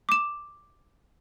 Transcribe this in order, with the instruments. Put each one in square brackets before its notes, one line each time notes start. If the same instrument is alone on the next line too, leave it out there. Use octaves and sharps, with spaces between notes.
[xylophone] D6 E7